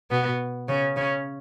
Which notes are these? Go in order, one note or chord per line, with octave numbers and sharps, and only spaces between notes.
B2 B3
C#3 C#4
C#3 C#4